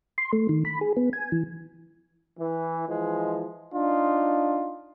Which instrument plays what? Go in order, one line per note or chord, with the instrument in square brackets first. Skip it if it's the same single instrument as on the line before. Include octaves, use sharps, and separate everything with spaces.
[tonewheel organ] C6
A3
D#3
B5
G#4
B3
G#5
E3
[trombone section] E3
E3 F3 G#3
D4 D#4 F4